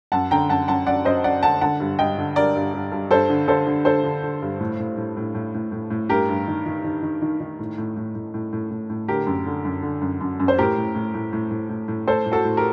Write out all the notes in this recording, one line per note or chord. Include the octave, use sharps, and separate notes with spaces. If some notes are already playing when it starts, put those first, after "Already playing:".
F#2 F#5 A5
D3 G5 A#5
F#2 F#5 A5
F#2 F#5 A5
F#2 D5 F#5
F#2 C5 D#5
F#2 D5 F#5
D3 F#5 A5
D3 F#5 A5
G2
G2 D#5 G5
D3
G2 A#4 D5
G2
G2
G2
G2 A4 C5
D3
D3 A4 C5
D3
D3 A4 C5
D3
D3
G2
A2
A2
A2
A2
A2
A2
A2
A2
G2 G4 A#4
G2
D#3
D#3
D#3
D#3
D#3
D#3
A2
A2
A2
A2
A2
A2
A2
A2
D3 G4 A#4
F#2
D3
F#2
D3
F#2
F#2
F#2
C5
A2 G4 A#4
A2
A2
A2
A2
A2
A2
A2
A2 A4 C5
A2
F#4 A4
A2
G4 A#4